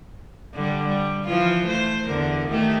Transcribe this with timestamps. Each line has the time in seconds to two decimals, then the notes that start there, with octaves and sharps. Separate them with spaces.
0.54 D3 G3
0.88 G3
1.26 E3 F3 F4
1.66 A3 C5
2.06 E2 D3 A#4
2.49 D#3 A3 G4